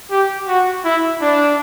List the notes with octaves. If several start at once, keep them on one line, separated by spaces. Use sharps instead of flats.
G4
F#4
E4
D4